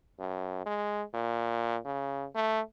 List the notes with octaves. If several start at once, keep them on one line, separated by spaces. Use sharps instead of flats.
F#2
G#3
A#2
C#3
A3